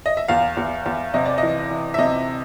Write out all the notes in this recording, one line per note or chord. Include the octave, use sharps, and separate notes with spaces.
D#5
E5
E2 F5
E2
E2
C3 D#5
D5
E3 D#5
E3
E5
C3 D#5